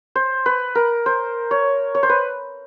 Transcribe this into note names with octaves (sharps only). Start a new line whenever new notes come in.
C5
B4
A#4
C5
C#5
C#5
C5
B4